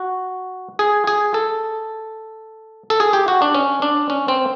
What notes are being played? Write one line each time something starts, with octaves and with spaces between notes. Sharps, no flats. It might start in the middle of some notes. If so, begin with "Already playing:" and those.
Already playing: F#4
G#4
G#4
A4
A4
G#4
G4
F#4
D4
C#4
D4
C#4
C4